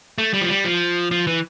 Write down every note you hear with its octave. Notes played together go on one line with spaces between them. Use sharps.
A3
G3
F3
G3
F3
F3
E3